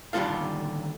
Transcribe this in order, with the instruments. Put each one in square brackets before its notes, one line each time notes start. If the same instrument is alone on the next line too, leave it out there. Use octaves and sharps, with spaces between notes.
[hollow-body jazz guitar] D#2 D3 G3 F4 A4 F5